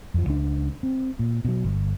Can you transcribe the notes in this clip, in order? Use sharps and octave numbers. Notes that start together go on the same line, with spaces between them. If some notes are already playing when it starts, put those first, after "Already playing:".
F2 F3
C#2 D4
C4
A#2
B2 F#3
G1